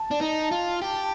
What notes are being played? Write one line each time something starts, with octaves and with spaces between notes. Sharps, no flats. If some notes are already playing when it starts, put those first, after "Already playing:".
Already playing: A5
D4
D#4
F4
G4